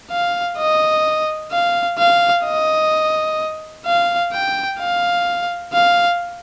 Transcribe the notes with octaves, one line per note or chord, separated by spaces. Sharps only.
F5
D#5
F5
F5
D#5
F5
G5
F5
F5